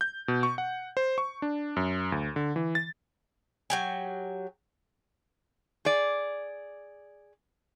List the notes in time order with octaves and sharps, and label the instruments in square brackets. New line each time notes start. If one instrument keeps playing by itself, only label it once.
[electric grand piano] G6
B2
C#6
F#5
C5
C#6
D4
F#2
D2
D3
E3
A6
[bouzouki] F#3 G4 G#5
[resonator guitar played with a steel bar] G#4 D5